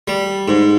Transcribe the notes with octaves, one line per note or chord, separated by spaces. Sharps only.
G3
G#2